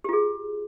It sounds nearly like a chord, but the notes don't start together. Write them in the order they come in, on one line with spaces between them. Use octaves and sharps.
G4 F4 G#4